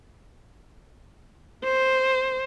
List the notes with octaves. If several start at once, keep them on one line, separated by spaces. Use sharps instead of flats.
C5